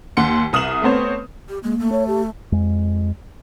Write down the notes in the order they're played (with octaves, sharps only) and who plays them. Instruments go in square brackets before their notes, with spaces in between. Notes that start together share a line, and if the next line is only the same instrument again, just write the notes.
[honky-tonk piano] D#2 F#5 C6 C#7
C2 D#6 F6 E7 F#7
A3 B3 C4 C5 C#5
[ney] G4
[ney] G#3 [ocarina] A#3
[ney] A3
[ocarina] C#5
G4
[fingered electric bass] F2 G#3